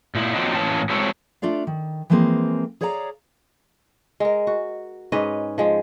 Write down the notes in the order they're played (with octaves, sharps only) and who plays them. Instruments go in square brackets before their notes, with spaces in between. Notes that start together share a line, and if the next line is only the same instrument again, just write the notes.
[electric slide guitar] A#2 E4
F3 F#3 A#3 C4 D4 D#4
A2 E3 A#3 C#4 A5
F#3 G#3 C4 E4 A4 C#5
[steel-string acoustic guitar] A3 D4 F4 D5 F5
D#3
E3 F3 G#3 A#3 C4
G#4 C#5 D5 F5 F#5 A#5
[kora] G#3 A#4
F#4
G#2 C#4 B4 D#5
F3 G#3